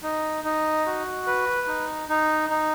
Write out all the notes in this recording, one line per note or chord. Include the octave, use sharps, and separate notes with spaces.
D#4
D#4
F#4
B4
D#4
D#4
D#4